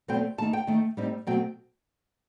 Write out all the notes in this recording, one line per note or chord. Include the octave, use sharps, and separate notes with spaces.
E2 B2 F#3 A3 C4 G5
D#3 A3 D#4 A5
G5
D#3 A3 D#4
A2 G3 C4 D#4
B2 F#3 A3 C4 G5